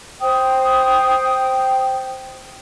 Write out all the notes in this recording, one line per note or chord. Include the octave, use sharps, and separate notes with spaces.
C5 G5 D#6